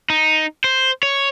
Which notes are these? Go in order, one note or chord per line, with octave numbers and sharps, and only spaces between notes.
D#4
C5
C#5